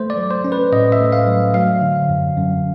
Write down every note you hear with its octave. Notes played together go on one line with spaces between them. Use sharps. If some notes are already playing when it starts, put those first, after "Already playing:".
Already playing: A3 C5
D5
F#3
C5
C#4
B4
A2 D#5
E5
A3
F5
F#3
F#3 F5
D3
F#2
F#2